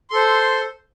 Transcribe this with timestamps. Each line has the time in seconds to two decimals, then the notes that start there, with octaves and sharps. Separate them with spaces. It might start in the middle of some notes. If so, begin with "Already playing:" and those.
0.10 C6
0.13 A4
0.16 C5